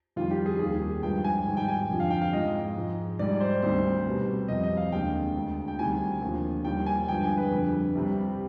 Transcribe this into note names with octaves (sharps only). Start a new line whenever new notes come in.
F2 D#3 G3 F4
G4
G#4
D#2 D#3 G3 G#4
G2 F3 G#3 G5
G#5
G#2 D#3 G3
G5
G#5
F2 D3 F3
F5
G5
F5
G#2 F3 G#3 D#5
G#2 F3 G#3
G#2 G3 D5
C5
D2 C3 D#3 G3 C5
C2 B2 G3
F2 C3 G3 D#5
D#5
F5
D#2 D3 G#3 G5
D2 D3 G#3
G5
D2 C3 D#3 G3 G#5
D#2 D3 F3
D#2 D#3 G3 G5
G#5
G2 D3 F3 G#3 G5
G#5
B4
F2 D3 G3
C2 C3 G3